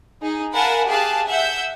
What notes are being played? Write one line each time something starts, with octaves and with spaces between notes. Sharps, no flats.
D#4 G#4
A#4 F5 F#5 G#5 A5 B5
G4 G#4 F5 A5 F#6
E5 F#5 E6 G6